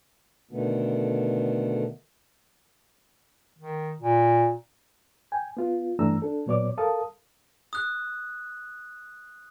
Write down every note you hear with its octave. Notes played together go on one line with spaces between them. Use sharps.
B2 D3 D#3 A3 B3
D#3
A#2
G5 G#5
B3 F4
G2 E3 A3 D4 A#5 E6
D4 A4
A#2 F#3 B3 C#5 D5 D6
A4 A#4 F5 A5 D#6
D#6 F#6